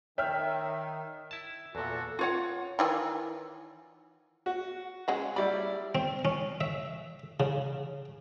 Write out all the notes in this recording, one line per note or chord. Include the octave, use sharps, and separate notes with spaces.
D#3 C#5 E5 G5 F6
E4 A5
E2 A#2 F#4 A4
F4 C#5 F#5
D#3 E3 G#5
F#4
C#3 G#3 F#5
F#3 G3 E4 D5 B5
C4
C#4
E5
C#3